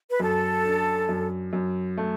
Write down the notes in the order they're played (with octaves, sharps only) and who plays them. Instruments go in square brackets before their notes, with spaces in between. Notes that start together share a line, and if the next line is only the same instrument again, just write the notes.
[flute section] B4
[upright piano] F#2 [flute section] A4
[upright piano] D4
F#2
F#2
A3